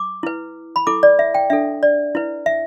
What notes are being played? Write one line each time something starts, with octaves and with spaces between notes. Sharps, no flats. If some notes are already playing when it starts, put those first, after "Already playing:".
Already playing: D6
E4 B4
B5
E4 A4 D6
D5
E5
G5
D4 A4 E5
D5
E4 B4
E5